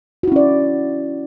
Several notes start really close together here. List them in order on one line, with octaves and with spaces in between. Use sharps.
F#4 E4 C#4 D5